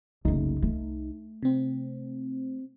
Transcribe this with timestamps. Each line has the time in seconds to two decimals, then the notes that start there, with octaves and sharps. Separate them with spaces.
0.25 F#1 C2 A3 D#4
0.62 A3
1.43 C3 C4